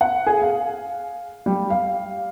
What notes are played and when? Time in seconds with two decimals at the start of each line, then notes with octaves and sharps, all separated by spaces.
0.01 F#5
0.27 G#4
0.42 F5
1.46 G3
1.70 F5